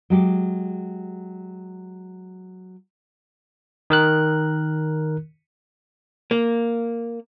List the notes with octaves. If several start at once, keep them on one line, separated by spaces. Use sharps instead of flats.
F#3 G#3 G4
D#3 A#4 F#6
A#3